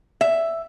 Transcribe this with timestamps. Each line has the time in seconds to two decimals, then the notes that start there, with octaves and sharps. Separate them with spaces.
0.21 E5